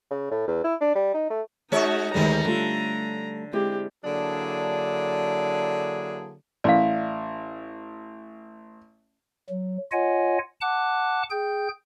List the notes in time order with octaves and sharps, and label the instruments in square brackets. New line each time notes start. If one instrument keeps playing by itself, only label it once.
[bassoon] C#3
A2
E2
E4
D4
G3
D#4
A3
[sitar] G#3 C#5 [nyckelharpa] D#4 F#4
[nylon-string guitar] D2 G#3 B4 [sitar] D#3 G3 [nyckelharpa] A#5
[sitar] D3 [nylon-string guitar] G3 A3 F4
[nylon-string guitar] G#3 C4 E4 [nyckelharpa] G4
[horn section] D3 F#3 A#3 D4 E4 G#4
[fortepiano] A1 [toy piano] D5 F5
[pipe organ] F#3
F4 C#5 D#5 F#5 G#5
F#5 A5 D6 F#6
G#4 G5 G6